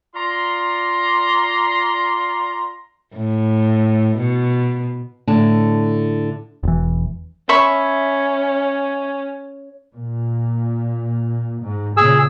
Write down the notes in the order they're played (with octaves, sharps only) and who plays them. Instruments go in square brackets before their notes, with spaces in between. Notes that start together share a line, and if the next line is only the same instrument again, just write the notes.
[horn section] F4 D5 A#5 C6
[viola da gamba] A2
B2
[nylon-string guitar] A2 D3 E4 A5
[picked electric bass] E1 E3
[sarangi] C#4 [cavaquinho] E5 B5 C#6
[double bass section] A#2
G#2
[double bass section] A#2 C#3 [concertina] G#4 E6